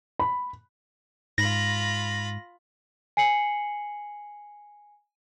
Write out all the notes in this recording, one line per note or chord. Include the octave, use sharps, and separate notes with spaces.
B5
G#2 F4 B5 A#6
G#5 C7 C#7 F#7